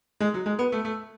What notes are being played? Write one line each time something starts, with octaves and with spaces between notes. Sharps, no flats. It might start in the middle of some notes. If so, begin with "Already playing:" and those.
G#3
F#3
G#3
B3
A3
A3